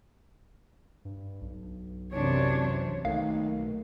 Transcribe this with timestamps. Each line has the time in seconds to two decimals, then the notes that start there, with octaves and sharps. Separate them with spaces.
1.05 G2
1.41 B1
2.12 F#2 C3 E3 D4 C#5
3.05 B1 D#3 A3 A#3 F5